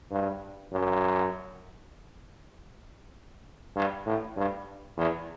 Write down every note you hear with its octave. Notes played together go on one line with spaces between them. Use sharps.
G2
F#2
G2
A2
G2
E2